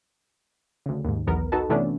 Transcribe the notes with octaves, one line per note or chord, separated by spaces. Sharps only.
D2 C#3
D#2 G#2
B1 E2 B3 A#4
D#4 F#4 A4 B4 A5
C3 E3 A3 B3 C#4 D4